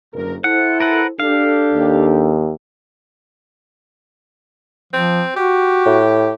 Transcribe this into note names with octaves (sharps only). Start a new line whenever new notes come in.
F#1 D2 A#4
E4 A4 C5 F#5
A#4 B4 F#5
D4 G4 A4 F5
D#2
F3 C4
F#4 G4
A2